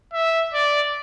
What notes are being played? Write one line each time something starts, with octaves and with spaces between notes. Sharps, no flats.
E5
D5